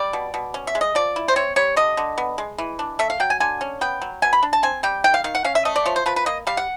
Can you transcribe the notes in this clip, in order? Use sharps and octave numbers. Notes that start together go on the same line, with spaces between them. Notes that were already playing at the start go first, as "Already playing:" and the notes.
Already playing: G3 D5
B2
B2
C#4
E5
G#3
D#5
F3 D5
E4
C5
C4 C#5
G3 C#5
D3 D#5
D3
B3
G#3
E3
D4
A3 E5
F5
F#3 G5
G#5
D3 G#5
C#4
B3 G5
F#3
B2 G#5
B5
D4
A5
C4 G#5
G3 G5
D#3 G5
F5
D#3 F5
F#5
C#4 F5
E5
A3 D#5
D5
F3 C#5
C5
F3 B4
B4
A#3 D#5
G3 F5
F#5